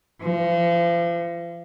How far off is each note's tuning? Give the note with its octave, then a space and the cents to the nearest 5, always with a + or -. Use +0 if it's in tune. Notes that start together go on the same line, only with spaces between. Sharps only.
F3 -35